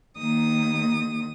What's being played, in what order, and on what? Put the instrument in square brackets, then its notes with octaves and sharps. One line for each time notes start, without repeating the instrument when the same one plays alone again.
[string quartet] D#2 D#3 A#3 D#6